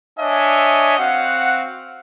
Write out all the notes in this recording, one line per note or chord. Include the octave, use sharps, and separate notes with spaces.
D4 C#5 D#5 E5 G#5
C4 F#4 F5 F#5